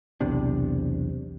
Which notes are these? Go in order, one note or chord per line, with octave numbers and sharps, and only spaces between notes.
B1 E2 C3 D4